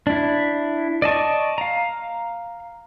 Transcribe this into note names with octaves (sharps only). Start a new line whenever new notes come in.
D4 E4
D5 D#5 A5 C#6
F5 A#5